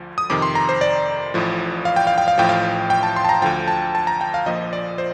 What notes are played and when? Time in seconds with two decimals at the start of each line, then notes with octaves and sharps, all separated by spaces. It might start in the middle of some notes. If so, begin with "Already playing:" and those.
Already playing: D2 D3 F3
0.18 D#6
0.30 F2 C3 D#3 D6
0.42 C6
0.55 A#5
0.69 C5
0.81 D5
1.34 A1 A2 F3
1.85 F5
1.96 G5
2.07 F5
2.18 G5
2.28 F5
2.38 A1 A2 F3 G5
2.49 F5
2.90 G5
3.03 A5
3.16 C6
3.25 A5
3.29 A#5
3.42 D2 D3 F3 G5
3.68 A5
3.95 A5
4.07 A#5
4.21 G5
4.34 F5
4.46 A#1 A#2 F3 D#5
4.73 D5
4.98 C5